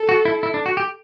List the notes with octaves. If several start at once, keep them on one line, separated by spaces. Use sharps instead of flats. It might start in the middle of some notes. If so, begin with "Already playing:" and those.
Already playing: A4
F#4
E4
E4
D4
F#4
G4